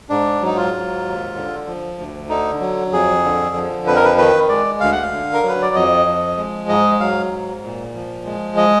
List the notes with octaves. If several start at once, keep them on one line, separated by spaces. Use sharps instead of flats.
G#2 D4
F#3 D#4
F4
G#2
D#2
D3
F3
D2
D3 D#4
F#3
F2 G#4
D3
F3
F2 B4
A#4
B4
D#3 B4
G#3 D5
D2 F5
F#5
F5
D3
A#4
F#3
B4
D5
F2 D#5
F3
G#3
G#2 D#5
F#3 F5
G#2
A#2
F3
G#3
D#5